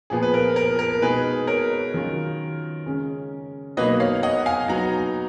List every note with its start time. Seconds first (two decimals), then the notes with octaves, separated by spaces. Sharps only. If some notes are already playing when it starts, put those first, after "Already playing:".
0.10 A#2 F3 B3 G#4
0.22 B4
0.34 A#4
0.56 A#4
0.79 A#4
1.02 B2 G#3 D#4 G#4 B4
1.47 A#4 C#5
1.94 D#3 F#3 C#4 F4
2.86 C#3 G#3 C#4
3.77 B2 F#3 A#3 D#4 B4 D#5
4.00 C#5 F5
4.23 D#5 F#5
4.46 F5 G#5
4.68 F#3 B3 D#4 F#5 A#5